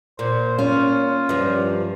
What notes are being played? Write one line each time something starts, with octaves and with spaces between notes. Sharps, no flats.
A#2 C5
C#4 F4
G2 F3